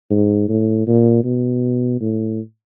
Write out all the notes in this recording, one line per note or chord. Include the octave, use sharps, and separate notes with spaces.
G#2
A2
A#2
B2
A2